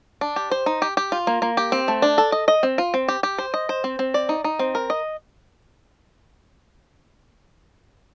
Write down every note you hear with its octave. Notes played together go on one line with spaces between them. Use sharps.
D4
G4
C5
D#4
G4
G4
F4
A#3
A#3
G4
C4
A3
D4
A4
D#5
D#5
C4
F4
C4
G4
G4
C5
D#5
C5
C4
C4
D5
D#4
D#4
C4
A#4
D#5